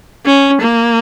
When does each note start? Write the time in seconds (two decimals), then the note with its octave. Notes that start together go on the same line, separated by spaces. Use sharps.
0.26 C#4
0.62 A#3